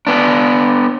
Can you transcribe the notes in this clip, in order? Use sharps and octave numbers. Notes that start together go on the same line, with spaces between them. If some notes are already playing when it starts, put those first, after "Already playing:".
B3 D4